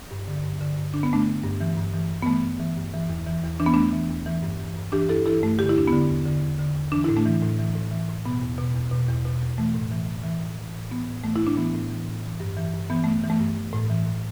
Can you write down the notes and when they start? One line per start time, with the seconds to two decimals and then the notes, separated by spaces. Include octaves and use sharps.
0.11 G2
0.27 D3
0.44 G2
0.61 D3
0.77 G2
0.94 D3 D4
1.03 B3
1.11 G2 A3 D4
1.27 D3
1.44 G2
1.61 E3
1.77 G2
1.94 E3
2.10 G2
2.22 B3
2.26 E3 A3
2.43 G2
2.60 E3
2.77 G2
2.93 E3
3.10 E2
3.27 E3
3.43 E2
3.60 E3 D4
3.66 B3
3.74 E2 A3 D4
3.92 E3
4.10 E2
4.26 E3
4.42 G2
4.59 E3
4.75 G2
4.92 E3 D4 G4
5.09 G2 E4 A4
5.26 E3 E4 A4
5.43 G2 A3
5.59 D3 G4
5.69 E4
5.76 E2 D4
5.88 D3 B3 E4
6.09 E2
6.26 D3
6.42 E2
6.59 D3
6.75 E2
6.92 E3 D4
7.04 A2 E4
7.17 A3 D4
7.25 E3
7.42 A2
7.59 E3
7.75 A2
7.91 E3
8.09 A2
8.25 B2 B3
8.42 E2
8.58 B2
8.75 E2
8.91 B2
9.08 E2
9.25 B2
9.42 E2
9.58 E3 A3
9.74 A2
9.91 E3
10.08 A2
10.24 E3
10.41 A2
10.58 E3
10.74 A2
10.91 E3 B3
11.07 A2
11.24 E3 A3
11.36 A2 E4
11.47 D4
11.57 E3 B3
11.74 A2
11.90 E3
12.07 A2
12.24 E3
12.40 G2
12.57 E3
12.73 G2
12.90 E3 B3
13.04 G2 A3
13.23 E3
13.30 A3
13.39 G2
13.57 E3
13.73 A2
13.90 E3
14.06 A2